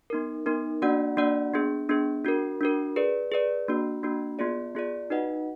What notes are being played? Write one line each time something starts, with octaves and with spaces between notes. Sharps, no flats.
B3 D#4 A#4
B3 D#4 A#4
A#3 D4 F#4 D5 F#5
A#3 D4 F#4 D5 F#5
B3 D4 G#4
B3 D4 G#4
D4 F#4 A#4
D4 F#4 A#4
G#4 B4 D5
G#4 B4 D5
A#3 D4 F#4
A#3 D4 F#4
B3 F4 G#4 D5
B3 F4 G#4 D5
D#4 F#4 B4 D#5 F#5